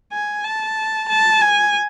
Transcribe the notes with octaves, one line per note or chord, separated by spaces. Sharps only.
G#5
A5
A5
G#5